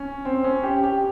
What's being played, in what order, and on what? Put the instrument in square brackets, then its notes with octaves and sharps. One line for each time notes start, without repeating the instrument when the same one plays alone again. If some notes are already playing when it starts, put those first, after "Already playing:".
Already playing: [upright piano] C#4
C4
C#4
G4
G4